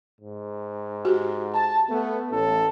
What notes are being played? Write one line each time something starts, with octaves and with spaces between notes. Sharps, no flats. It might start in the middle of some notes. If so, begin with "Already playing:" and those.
G#2
F#4 G4
A5
A3 B3 A4 B4
A1 A4